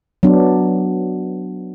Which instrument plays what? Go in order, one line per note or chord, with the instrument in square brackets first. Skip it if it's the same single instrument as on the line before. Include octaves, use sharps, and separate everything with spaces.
[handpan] F#3 B3 D4